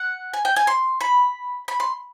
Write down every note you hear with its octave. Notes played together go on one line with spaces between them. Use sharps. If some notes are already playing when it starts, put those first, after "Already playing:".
Already playing: F#5
G#5
G5
G#5
C6
B5
B5
C6